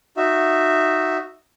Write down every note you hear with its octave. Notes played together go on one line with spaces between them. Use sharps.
D#4 F#4 E5